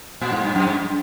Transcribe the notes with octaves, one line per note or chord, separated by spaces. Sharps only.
A#2
G#2
G2
F#2
G2